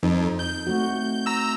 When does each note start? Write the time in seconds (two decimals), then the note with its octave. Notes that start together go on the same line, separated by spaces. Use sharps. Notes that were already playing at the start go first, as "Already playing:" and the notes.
0.03 F2 D#4
0.39 G6
0.67 A3 C4 F#4
1.26 A#5 E6